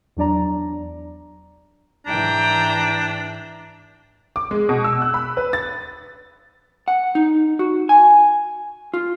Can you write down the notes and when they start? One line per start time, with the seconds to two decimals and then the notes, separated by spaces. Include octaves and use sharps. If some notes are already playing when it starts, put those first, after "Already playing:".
0.17 E2 F#3 D4 D5 A#5
2.06 G#2 E3 D4 G5 A#5
4.36 D6
4.51 G#3
4.69 B2
4.84 E6
5.02 F#6
5.14 B5
5.37 B4
5.53 A6
6.88 F#5
7.15 D#4
7.59 F#4
7.89 G#5
8.94 F4